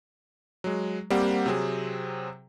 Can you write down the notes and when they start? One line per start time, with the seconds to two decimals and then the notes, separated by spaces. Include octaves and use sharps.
0.64 F#3 G#3
1.10 G3 A#3 C4 G4 C5 F#5
1.46 C3 F#3 C4 G#4